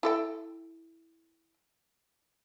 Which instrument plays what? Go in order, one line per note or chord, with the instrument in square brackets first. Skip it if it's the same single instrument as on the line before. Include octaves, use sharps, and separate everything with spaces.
[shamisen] E4 A4 G5